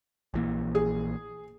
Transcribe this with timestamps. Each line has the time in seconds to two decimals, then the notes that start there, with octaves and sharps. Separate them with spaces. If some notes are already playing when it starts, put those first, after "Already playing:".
0.34 A#1 E3 A#3
0.75 G#4